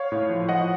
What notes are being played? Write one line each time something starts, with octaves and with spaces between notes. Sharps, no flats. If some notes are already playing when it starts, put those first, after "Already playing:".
Already playing: C#5 F5
A2
F3
F3 D#5 F#5